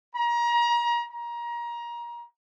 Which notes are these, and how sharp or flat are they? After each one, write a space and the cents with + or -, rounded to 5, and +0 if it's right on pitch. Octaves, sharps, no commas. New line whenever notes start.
A#5 +30
A#5 +25